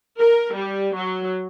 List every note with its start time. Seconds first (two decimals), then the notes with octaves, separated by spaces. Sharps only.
0.19 A#4
0.54 G3
0.96 F#3